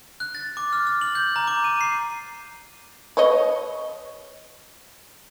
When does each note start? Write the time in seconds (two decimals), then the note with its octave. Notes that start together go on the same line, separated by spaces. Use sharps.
0.20 F#6
0.35 A6
0.57 D6
0.73 F6
0.87 F6
1.01 F#7
1.15 G6
1.36 A#5
1.47 D6
1.64 D#7
1.81 C7
3.17 B4 C#5 D#5